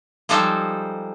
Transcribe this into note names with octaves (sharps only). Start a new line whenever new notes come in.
F3 G3 G#3 D#4 A4 C5